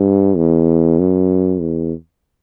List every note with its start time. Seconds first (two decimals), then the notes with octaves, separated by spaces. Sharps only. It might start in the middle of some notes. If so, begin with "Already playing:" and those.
Already playing: G2
0.37 E2
0.99 F#2
1.60 E2